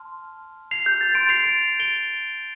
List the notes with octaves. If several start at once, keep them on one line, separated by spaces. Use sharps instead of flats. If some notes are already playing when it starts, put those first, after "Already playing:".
Already playing: A5 C6 F6
C7 F7
G6
A6
C6 G6 A6 D7
C7 F7
A6 D7
D7 G7